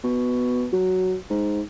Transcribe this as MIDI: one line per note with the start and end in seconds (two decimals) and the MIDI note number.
0.03 0.67 47
0.73 1.17 54
1.30 1.61 44